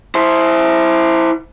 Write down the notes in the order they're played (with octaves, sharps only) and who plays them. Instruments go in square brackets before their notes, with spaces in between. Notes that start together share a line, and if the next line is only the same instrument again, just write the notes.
[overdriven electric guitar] E4 C5